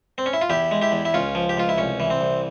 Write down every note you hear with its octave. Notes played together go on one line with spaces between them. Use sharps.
C4
C#4
E4
F4
E2 E4 G4
G#3
E4 G4
E2
E4
C#2 C#4 F4
F3
G4
C#2 F4
E4
C2 C#4
E3
C4
C2